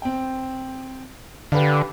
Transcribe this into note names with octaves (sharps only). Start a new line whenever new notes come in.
C4 G5
D3 G4 B4 F5